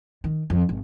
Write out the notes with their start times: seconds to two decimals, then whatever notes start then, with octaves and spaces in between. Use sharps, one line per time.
0.24 D#3
0.50 F2
0.69 G#1